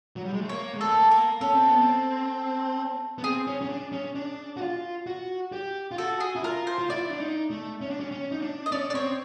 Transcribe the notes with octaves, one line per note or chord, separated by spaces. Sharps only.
F#3
G3
G#3
A3
A#3 C#5
G#3
A3 A4
A#3
A#4
C#4 A4
C4
B3
C4
B3
C4 G#4
C#4
C#4
D4
C#4
D4
F#4
F4
F#4
G4
F4
F#4 A4
G#4
E4
F4 A#4
C5
F4
E4 D5
D4
D#4
A3
C#4
D4
C#4
C#4
D#4
D4
D#5
C#4 D5
D5
C4 C#5